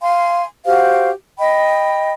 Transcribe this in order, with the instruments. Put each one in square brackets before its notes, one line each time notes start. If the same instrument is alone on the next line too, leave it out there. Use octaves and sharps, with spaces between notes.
[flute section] F5 G#5 C6
F#4 G4 C5 F5
D#5 G5 B5